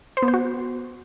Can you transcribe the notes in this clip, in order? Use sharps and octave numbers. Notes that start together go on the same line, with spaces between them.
C5
B3
C5
F#4